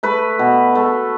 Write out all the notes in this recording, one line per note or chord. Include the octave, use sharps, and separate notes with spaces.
A3 B4
B2
A3